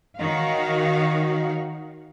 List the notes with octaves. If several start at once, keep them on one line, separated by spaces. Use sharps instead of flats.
D#3 D#4 F#4 C#5 F5